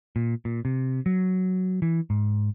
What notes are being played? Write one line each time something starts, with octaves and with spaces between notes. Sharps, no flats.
A#2
A#2
C3
F#3
E3
G#2